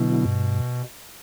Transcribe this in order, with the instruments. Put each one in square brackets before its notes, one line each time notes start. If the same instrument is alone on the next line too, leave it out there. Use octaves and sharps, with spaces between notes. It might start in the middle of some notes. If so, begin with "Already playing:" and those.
Already playing: [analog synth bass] B2 [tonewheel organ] D3 F#3 B3 E4
[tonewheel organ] G2